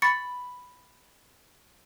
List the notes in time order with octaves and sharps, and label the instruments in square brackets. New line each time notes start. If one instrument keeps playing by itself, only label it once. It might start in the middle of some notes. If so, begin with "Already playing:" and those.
[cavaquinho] B5 [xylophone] C#6 A6 C#7